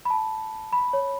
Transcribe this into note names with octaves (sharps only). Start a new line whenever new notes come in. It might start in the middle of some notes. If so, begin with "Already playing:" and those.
B5
A5
B5
C#5